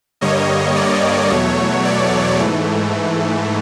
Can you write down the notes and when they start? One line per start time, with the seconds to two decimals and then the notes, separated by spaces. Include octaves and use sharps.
0.21 G2 D3 G3 A#3 C#5 D#5
0.75 D5
1.30 E2 B2 F#3 A3 C#5
1.85 D5
2.39 G#2 E3 A3